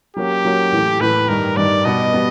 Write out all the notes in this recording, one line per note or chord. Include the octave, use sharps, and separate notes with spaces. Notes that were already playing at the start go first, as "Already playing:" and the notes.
F#3 A#3 C#4 F#4 G4
F#3 A#3 C#4 F#4
A2 E3 A3
A2 E3 A3 B4
G2 D#3 G3 A#4
G2 D#3 G3 D5
B2 G3 B3 D#5
G3 B3